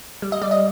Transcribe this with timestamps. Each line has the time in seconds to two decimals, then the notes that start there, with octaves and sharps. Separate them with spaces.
0.22 G3
0.32 D#5
0.42 G3 D5
0.51 D#5